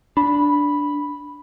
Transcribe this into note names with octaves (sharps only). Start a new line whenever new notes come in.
D4 B5